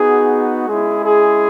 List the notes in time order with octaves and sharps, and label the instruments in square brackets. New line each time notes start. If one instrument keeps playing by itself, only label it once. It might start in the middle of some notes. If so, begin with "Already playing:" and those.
Already playing: [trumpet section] B3 D#4 F#4 G#4
G#3 C#4 E4 G#4
G#4